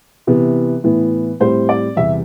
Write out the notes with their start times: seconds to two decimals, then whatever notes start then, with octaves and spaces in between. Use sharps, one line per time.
0.27 C3 E3 B3
0.84 A2 E3 B3
1.40 A2 G3 C4 C5
1.69 D5
1.96 E2 C3 G3 E5